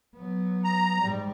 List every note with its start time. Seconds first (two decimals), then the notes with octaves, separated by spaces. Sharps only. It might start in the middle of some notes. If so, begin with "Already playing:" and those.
0.16 F#3 B3
0.64 A#5
1.00 G#2 G3